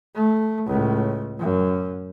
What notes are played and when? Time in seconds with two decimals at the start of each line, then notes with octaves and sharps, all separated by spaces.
0.15 A3
0.67 C#2 A2
1.39 F#2